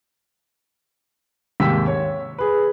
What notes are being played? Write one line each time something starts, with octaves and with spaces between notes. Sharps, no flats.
D#2 G#2 C3 G5 E6 B6
C#5
G#4 B4